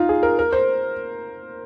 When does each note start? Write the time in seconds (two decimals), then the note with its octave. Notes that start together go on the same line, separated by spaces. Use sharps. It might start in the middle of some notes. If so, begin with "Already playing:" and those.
Already playing: D#4 F4
0.09 G#4
0.23 A#4
0.39 A#4
0.53 C5